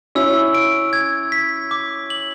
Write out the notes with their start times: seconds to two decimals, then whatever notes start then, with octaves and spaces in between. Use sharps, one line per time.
0.15 C#4 E4 E6
0.55 D7
0.93 G#6
1.32 B6
1.71 D6
2.10 F#7